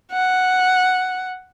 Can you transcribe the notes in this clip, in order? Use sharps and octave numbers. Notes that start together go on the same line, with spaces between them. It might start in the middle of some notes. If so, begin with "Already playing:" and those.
F#5